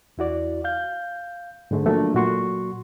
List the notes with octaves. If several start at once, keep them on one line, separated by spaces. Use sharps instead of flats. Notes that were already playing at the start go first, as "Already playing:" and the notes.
E2 E4 F#4 D5
F5 G6
G#2 D3 G#3 A3
F3 F#3 A3 A#3 D4 F#4
A#2 F#3 F#4 C6 C#6